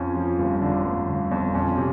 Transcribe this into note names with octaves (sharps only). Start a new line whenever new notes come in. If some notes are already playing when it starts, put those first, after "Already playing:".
Already playing: F2 F3 C#4
F3
G1
D3 D4
G1
G1
F2
F2 C#4
C3